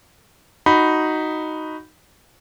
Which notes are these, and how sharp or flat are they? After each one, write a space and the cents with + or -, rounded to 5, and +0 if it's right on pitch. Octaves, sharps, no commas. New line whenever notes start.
D#4 +0 F#4 +0 B5 +0